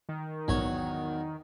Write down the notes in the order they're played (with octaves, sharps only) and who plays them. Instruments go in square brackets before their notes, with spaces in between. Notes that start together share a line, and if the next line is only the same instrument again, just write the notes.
[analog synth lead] D#3
[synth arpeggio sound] A#1 G#2 [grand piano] E2 [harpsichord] F#3 C#5